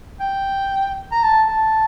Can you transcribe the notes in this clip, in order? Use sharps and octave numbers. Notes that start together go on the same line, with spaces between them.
G5
A#5
A5
A5